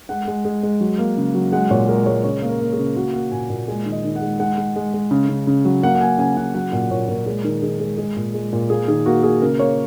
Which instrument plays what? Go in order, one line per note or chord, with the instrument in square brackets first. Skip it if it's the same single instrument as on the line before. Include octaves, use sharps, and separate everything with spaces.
[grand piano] G#3 F#5
G#3
G#3
G#3
F#3
A#3
C#3
F#3
G#3 F#5
A#2 C#5
G#3 A#4
G#3 C#5
C#3 C#5
A#3
A#4
A#3
G#4
C#3
A#3 F#4
A#3 F#5
A#2 G#5
A#2
G#3 G#5
D#3
D#5
D#3
F#5
G#3
G#3 F#5
G#3
G#3
G#3
C#3
C#3
C#3
F#3
A#3 F#5
F#5
A#3 G#5
C#3 G#5
C#3 F#5
F#3 F#5
A#2 F#5
A#2 C#5
A#2 A#4
G#3 G#4
D#3 A#4
D#3 G#4
G#3 G#4
G#3 G#4
A#2
G#3
A#2
A#3 G#4
D#3 G#4
A#3 F#4
A#3 G#4
C#3 A#4
A#3 C#5